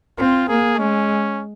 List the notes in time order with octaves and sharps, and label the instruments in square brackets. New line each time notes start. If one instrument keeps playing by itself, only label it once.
[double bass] C4 [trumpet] F4
[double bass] A#3 [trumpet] G#4
[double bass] G#3 [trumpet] C#4